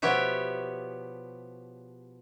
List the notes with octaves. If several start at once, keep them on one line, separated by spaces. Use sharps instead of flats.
B2 F3 B3 G4 C#5 E5